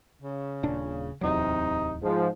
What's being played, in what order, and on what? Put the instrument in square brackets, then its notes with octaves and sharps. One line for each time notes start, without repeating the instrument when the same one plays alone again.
[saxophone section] C#3
[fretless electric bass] D#1 A#2 D4
[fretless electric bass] D1 E2 F#3 [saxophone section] C3 D#4
[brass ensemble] G#2 F3 [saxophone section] G#3